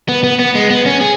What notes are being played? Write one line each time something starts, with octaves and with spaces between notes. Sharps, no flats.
B3
B3
B3
G#3
B3
C#4
G#4